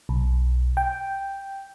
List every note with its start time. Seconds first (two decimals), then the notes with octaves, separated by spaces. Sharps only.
0.09 B1
0.77 G5